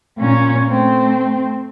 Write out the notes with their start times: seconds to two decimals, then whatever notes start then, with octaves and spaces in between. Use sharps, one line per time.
0.18 A#2 C#4
0.67 A3 C4